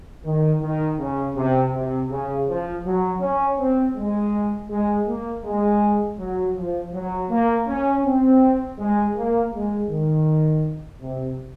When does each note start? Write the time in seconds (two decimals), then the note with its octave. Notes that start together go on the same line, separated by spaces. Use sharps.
0.24 D#3
0.61 D#3
0.99 C#3
1.35 C3
1.73 C3
2.10 C#3
2.47 F3
2.84 F#3
3.21 C#4
3.58 C4
3.96 G#3
4.70 G#3
5.07 A#3
5.44 G#3
6.19 F#3
6.56 F3
6.93 F#3
7.30 A#3
7.67 C#4
8.04 C4
8.78 G#3
9.16 A#3
9.52 G#3
9.89 D#3
11.01 C3